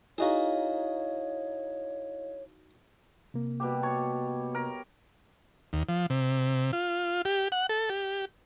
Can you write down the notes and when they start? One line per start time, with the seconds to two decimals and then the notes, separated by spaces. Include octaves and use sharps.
0.18 D#4 E4 F#4 G#4 C#5 D#5 F5
3.34 C3 A#3
3.60 B2 G3 G4
3.83 C#5 A5
4.55 A#4
5.73 D#2
5.89 F3
6.10 C3
6.73 F4
7.25 G4
7.52 F#5
7.69 A4
7.90 G4